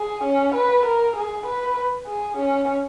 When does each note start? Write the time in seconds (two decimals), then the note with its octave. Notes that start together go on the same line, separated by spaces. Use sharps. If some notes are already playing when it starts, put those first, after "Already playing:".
Already playing: G#4
0.24 C#4
0.55 B4
0.85 A#4
1.16 G#4
1.46 B4
2.07 G#4
2.37 C#4